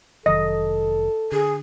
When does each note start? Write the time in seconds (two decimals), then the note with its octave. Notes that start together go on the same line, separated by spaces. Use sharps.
0.26 F1 D#3 F#3 A4 D#5
1.32 D3 G#4